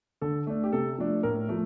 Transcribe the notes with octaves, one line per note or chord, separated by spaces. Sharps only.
D3 A4
A3 D4
G4
C3 A4
F3 A3 D4
A2 A#4
F3 A3